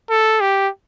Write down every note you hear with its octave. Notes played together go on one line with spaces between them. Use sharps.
A4
G4